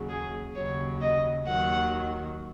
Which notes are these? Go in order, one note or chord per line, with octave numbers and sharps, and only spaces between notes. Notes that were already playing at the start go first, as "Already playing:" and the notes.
Already playing: D#2 C#3 F#3
G#4
D#2 C#3 F#3 C#5
D#5
D#2 D#3 F#3 F#5